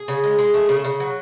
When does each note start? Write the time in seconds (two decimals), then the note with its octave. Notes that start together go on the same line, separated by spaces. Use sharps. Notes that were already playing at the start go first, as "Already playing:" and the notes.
Already playing: G#4
0.08 C#3
0.24 G#3
0.39 G#3
0.54 A3
0.69 C#3
0.85 C#3
1.00 F#3